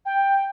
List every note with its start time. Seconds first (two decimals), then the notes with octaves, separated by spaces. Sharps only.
0.05 G5